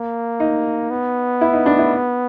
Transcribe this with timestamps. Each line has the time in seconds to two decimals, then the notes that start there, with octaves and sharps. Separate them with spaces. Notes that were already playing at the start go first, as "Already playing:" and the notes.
Already playing: A#3
0.40 D#4
0.90 B3
1.41 E4
1.53 D#4
1.66 D4
1.78 E4